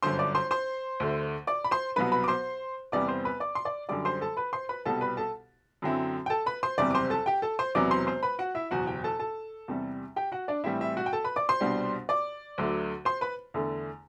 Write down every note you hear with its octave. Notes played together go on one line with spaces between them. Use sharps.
G1 F#2 D3 C5 C6
D5 D6
C5 C6
C5 C6
D2 D3 A3
D5 D6
B5
C5 C6
C2 B2 F#3 B3 B4 B5
B4 B5
D6
C5 C6
E2 C3 G3 B3 D5 D6
C5 C6
B4 B5
D5 D6
C6
D5 D6
F#2 D3 G3 D5 D6
C5 C6
A4 A5
B4 B5
C5 C6
B4 B5
C2 B2 G3 A4 A5
B4 B5
A4 A5
F#2 D3 F#3 C4 E4
G5
A4 A5
B4 B5
C5 C6
F#1 E2 C3 G3 D5 D6
D6
C5 C6
A4 A5
G4 G5
A4 A5
C5 C6
E1 E2 C3 F#3 B3 D5 D6
C5 C6
C5 C6
B4 B5
F#4 F#5
E4 E5
F#1 E2 B2 F#4 F#5
G4 G5
A4 A5
A4 A5
E2 C3 G3
G4 G5
F#4 F#5
D4 D5
A2 E3 G3 C4 E4 E5
E4 E5
F#4 F#5
G5
A4 A5
B4 B5
D5 D6
C5 C6
C2 B2 G3 D4
D5 D6
D2 D3 F#3 A3
C5 C6
B4 B5
E2 D3 A3